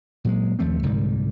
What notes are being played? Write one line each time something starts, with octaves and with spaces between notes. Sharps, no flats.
A#2 F#3 G#3
D#2 F3 A3 C4
C2 G#2 D3 G3